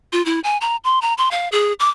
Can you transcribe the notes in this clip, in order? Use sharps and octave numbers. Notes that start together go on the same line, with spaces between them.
F4
E4
G#5
A#5
C6
A#5
C6
F5
G#4
D6